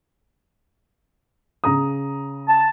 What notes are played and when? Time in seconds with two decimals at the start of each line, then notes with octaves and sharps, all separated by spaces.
1.64 C#3 A#5 D#6
2.48 A5